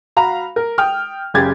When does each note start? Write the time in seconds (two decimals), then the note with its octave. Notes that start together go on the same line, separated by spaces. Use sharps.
0.16 F#4 F5 A#5 B5
0.56 A#4
0.78 G5 D#6 F6
1.34 F#1 C#3 G4 G#4 G#6 A6